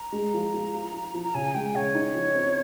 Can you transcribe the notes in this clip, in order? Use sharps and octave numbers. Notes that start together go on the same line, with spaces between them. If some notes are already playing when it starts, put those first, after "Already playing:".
Already playing: A#5
G#3
F3
F3
F4
F4
F3
A#5
C#3 G#5
G#3 G5
C#3 C#5
D#4
F3
C4